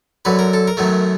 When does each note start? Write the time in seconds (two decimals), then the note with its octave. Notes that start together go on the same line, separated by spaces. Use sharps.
0.25 F#2 D3 F#3 B4
0.39 A#4
0.53 A4
0.67 A#4
0.77 F#2 D#3 F#3 A3